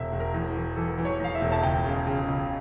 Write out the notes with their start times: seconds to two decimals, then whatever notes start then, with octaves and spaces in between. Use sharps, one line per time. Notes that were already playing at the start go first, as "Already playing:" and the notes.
Already playing: E1 E5
0.12 E1
0.20 A#4
0.34 E2
0.56 E3
0.76 E3 A4
0.98 E3
1.05 C#5
1.20 E2 F5
1.35 E5
1.41 E1
1.52 A5
1.63 C#2 G5
1.84 C#3
2.07 C#3
2.28 C#2